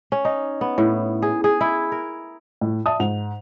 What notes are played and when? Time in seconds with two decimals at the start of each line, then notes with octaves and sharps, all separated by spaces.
0.12 C#4
0.25 D#4
0.61 B3
0.78 A2
1.22 G#4
1.44 G#4
1.61 E4
1.92 A#4
2.61 A2
2.86 D5 E5 A5 D#6
3.00 G#2 F7